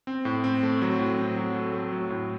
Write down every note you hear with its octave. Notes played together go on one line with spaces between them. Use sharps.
C4
A2
C4
A3
F#3
A2
C4
F#3
A3
A3
F#3
A2